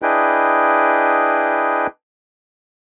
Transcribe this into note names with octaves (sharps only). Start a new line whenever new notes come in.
D4 E4 G#4 B4 D#5 G5